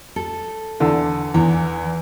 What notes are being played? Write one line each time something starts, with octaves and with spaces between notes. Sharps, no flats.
A4
E2 D3
E2 E3